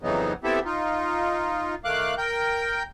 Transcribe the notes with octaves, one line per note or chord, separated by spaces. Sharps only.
F2 C#3 E3 F#3 B3 D#4
B3 C4 E4 G4 A4 E5
D#4 F4
D#3 A3 F5 D6 F#6
A#4 G5 G6